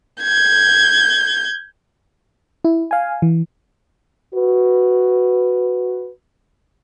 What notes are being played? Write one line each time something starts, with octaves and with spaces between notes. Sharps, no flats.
G6 G#6
E4
F5 G#5
E3
F#4 B4